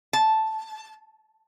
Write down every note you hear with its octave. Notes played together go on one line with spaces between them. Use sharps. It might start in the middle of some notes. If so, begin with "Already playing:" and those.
A5